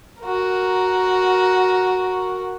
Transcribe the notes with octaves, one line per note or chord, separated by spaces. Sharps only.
F#4 A#4